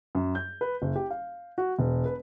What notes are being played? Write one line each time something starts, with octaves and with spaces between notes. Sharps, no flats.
F#2
G6
B4
F#1
G4
F5
F#4
E1
B4